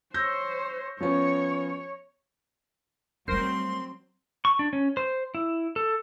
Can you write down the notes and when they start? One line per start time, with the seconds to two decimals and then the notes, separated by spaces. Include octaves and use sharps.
0.14 C5 C#5 E6 G6 A#6
1.01 F3 B3 C#4 C#5
3.28 F#3 G3 A3 C4 A#4 C5 C6
4.45 C#6
4.59 D4
4.73 C#4
4.97 C5
5.35 E4
5.76 A4